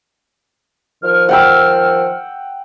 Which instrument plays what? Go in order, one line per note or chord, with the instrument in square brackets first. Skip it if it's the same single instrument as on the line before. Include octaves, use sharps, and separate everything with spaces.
[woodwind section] D#3 F3 F6
[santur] F#5 G5 E6